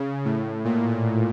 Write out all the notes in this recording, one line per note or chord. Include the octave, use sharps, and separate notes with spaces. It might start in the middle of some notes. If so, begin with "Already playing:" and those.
Already playing: C#3
A2
A#2